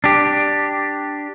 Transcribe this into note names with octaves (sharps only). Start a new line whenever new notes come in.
D4 G4